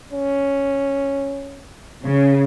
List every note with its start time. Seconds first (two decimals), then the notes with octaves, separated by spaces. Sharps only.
0.13 C#4
2.04 C#3